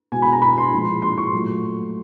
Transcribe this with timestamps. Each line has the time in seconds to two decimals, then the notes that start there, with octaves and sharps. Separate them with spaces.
0.12 B2 G#3 G#5
0.22 B5
0.32 A#5
0.42 B5
0.58 C6
0.72 A#2 F3 G#3
1.02 C6
1.18 C#6
1.33 A#2 F#3 A3